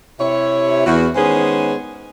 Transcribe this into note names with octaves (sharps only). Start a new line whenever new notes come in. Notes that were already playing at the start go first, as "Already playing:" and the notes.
C3 E4 C#5
E2 F#4
D#3 G#3 B3 C#4 G#4 C5